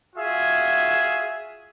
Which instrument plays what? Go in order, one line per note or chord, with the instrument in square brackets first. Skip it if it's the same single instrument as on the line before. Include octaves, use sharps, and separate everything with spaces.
[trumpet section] F4 F#4 G#4 E5